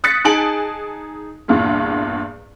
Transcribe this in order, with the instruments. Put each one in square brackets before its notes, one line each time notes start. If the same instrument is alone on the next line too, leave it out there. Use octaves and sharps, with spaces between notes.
[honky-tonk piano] D#6 F#6 A6 B6 C#7
D#4 G#4 G#5 A5 D7 F#7
E2 G2 A#2